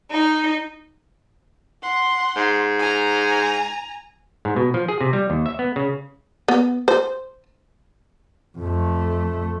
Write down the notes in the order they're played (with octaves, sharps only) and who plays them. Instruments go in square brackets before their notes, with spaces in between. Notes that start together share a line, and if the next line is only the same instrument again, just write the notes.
[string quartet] D#4
[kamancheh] F#5 C6
[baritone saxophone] G#2
[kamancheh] G#5 A#5
[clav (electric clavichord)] G#2
B2
F3
G#4
C3
G3
D#2
E5
B3
C#3
[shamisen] B3
C5
[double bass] F2 A3